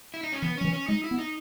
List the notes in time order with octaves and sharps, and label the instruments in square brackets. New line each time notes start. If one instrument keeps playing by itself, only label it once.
[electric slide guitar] E4
D#4
C#4
[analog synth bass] E3 [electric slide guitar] B3
[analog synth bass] F#3 [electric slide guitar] C#4
[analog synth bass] E3
[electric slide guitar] C#4
[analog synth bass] G#3 [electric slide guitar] D#4
[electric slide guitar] E4
[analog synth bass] B3
[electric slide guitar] D#4